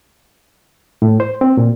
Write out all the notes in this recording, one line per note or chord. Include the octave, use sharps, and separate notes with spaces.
A2
C5
C4
A#2